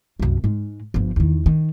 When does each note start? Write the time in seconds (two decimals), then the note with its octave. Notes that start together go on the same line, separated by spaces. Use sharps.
0.20 C2 F#2
0.44 G#2 G#3
0.94 G1 F3
1.16 E2 D#3
1.46 D#3